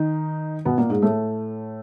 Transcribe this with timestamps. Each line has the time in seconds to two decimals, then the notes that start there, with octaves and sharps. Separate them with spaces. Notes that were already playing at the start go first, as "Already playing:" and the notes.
Already playing: D#3 D#4
0.65 B2 B3
0.78 A#2 A#3
0.90 G#2 G#3
1.02 A2 A3